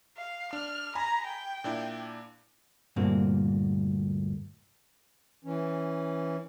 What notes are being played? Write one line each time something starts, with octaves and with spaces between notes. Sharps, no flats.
F5
D4 F6
G#5 A#5 B5
G5
A#2 D4 E4
D2 G2 A#2 D3 A#3 C4
E3 C#4